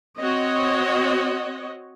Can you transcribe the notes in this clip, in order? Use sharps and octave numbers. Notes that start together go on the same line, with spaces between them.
C4 F#4 C#5 D#5